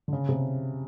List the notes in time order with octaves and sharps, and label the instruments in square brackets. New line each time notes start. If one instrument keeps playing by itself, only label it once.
[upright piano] D3
C#3
C3